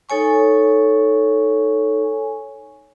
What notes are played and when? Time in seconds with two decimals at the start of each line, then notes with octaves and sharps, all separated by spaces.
0.09 D#4 A4 C#5 G#5 C#6